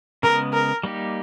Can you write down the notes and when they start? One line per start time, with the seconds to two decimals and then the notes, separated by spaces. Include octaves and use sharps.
0.23 C#3 G#3 B3 A#4
0.53 A#4
0.83 G3 A#3 D#4 G4